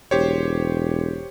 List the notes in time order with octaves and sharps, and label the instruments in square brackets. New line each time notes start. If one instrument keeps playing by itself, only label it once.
[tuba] E1 [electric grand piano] G4 C5 C#5